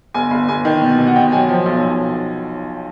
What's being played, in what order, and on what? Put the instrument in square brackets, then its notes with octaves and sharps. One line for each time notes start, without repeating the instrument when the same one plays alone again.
[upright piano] G1 G#5
G1
G1 G#5
D#3
B2
B2
F#5
B2 G5
F#3 G#5
F3
B1
B1